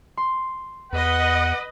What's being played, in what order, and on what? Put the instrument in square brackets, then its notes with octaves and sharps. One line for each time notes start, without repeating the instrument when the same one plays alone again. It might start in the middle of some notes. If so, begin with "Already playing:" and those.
[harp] C6
[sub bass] E2 [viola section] B4 D#5 [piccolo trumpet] F#5